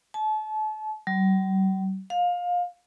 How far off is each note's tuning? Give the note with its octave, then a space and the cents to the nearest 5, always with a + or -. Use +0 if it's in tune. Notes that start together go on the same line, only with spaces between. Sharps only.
A5 -35
G3 -45
F5 +25